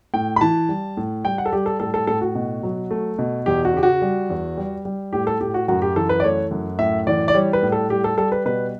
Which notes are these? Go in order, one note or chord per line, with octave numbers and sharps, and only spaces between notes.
A2 G5
B5
E3 A5
G3
A2
G3 G5
F#5
A4
G3 G4
A4
A2 A4
A4
A2 A4
F#4
B2
F#3
A3
B2
E2 G4
F#4
C#3 G4
F#4
G3
E2
G3
G3
A2 G4
A4
A2 G4
F#4
F#2 F#4
G4
E3 A4
B4
D5
A3 C#5
F#2
A2 E5
E3 D5
D5
G3 C#5
B4
A2
A4
G3 G4
A4
G3 A4
B4
B2 B4